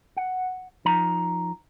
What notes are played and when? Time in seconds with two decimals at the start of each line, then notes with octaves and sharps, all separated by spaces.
0.17 F#5
0.85 F3 D#4 A#5